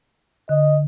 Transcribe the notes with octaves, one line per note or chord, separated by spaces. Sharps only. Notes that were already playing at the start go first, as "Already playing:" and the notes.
D3 D#5